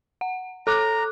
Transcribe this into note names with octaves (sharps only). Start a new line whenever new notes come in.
F#5
A4 A#5 D6 F#6